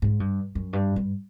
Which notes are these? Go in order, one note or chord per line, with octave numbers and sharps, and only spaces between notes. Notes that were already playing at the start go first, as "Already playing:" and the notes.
G#2
G2
F#2
G2
G2